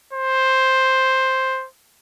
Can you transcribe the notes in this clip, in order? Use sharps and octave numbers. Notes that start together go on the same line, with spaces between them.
C5